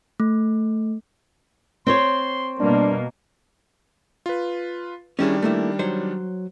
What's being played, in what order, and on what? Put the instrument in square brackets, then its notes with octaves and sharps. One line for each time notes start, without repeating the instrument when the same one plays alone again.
[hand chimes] A3
[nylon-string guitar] C4 C5 C#5 [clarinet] C6
[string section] B2 A#3 [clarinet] G3 [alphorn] D4
[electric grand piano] F4 B4
[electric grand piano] D#3 G3 D4 [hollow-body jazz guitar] C#4 E4 G#4
[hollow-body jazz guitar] A3 A#3 E4
F#3 C5 C#5